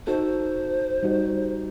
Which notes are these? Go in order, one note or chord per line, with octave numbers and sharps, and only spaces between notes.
D#4 F#4 A4 C5
G3 D#4 F#4